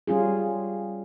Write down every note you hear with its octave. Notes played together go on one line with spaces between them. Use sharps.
G3 C#4 F4 G#4